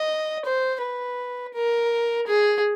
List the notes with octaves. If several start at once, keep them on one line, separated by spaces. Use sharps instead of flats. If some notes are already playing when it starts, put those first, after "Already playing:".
Already playing: D#5
C5
B4
A#4
G#4